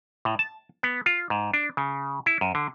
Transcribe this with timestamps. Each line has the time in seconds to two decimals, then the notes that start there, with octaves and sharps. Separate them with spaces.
0.25 A2
0.39 A5
0.83 B3
1.06 F4
1.30 G#2
1.54 D4
1.77 C#3
2.26 E4
2.41 F#2
2.55 D3